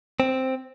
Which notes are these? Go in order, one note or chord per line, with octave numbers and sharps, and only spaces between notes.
C4